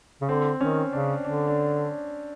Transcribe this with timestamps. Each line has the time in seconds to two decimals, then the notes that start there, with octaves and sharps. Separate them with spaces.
0.21 C#3
0.29 D3 C4
0.61 D#3 C#4
0.92 C#3 D4
1.24 D3 D4
1.48 D4